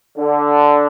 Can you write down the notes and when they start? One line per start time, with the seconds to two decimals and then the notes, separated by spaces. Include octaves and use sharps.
0.18 D3